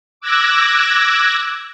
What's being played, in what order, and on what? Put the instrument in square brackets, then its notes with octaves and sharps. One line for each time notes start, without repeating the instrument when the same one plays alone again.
[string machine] D6 E6 F#6 G#6 A#6